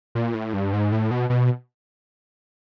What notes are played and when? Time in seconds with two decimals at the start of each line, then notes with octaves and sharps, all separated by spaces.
0.15 A#2
0.34 A2
0.53 G2
0.73 G#2
0.92 A2
1.11 B2
1.30 B2